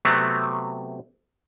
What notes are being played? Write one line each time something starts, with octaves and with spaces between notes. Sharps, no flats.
C3 F#3 A3 B3 C4